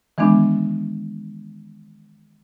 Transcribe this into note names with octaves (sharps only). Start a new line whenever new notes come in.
D#3 E3 G#3 B3 D4